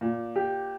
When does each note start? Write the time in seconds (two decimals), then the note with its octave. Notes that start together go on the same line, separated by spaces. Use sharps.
0.01 A#2
0.36 G4